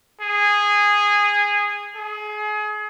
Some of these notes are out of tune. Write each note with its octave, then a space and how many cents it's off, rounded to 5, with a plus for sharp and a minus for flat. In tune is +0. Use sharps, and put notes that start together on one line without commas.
G#4 -15
G#4 +30